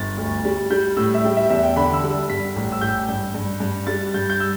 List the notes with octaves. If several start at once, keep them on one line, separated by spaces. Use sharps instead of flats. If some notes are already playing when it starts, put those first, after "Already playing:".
Already playing: G1 A6
D2
G3
G3 G6
A2 E6
E5
G3 G5
E5
E2 E5
G5
D3 B5
E6
G3
G2 B6
A1
E6
A1 G6
G2
G2
G2
G3 A6
G2 G6
G6
E6